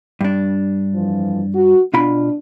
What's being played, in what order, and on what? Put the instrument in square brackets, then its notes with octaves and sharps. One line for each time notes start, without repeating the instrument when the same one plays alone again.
[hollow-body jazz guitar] G2 D4
[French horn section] F2 E3 F3
F#4
[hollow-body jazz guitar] B2 F4 B5 [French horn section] D4